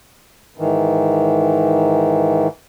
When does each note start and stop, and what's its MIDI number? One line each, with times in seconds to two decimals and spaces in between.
0.58 2.48 44
0.58 2.48 51
0.58 2.48 52